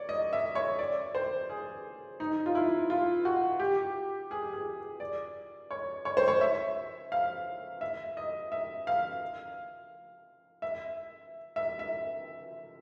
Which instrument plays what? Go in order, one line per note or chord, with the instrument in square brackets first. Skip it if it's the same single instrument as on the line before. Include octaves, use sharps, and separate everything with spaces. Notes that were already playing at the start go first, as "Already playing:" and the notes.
Already playing: [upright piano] C#5 D5
D#5
E5
C#5
D5
C5
G#4
D#4
F4
E4
F4
F#4
G4
G#4
G#4
D5
C#5
C#5
C5
C#5
E5
F5
E5
D#5
E5
F5
E5
E5
E5